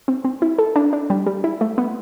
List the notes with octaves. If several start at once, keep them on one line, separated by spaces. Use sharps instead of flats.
C4
C4
E4
A4
D4
D4
G3
G3
E4
A3
B3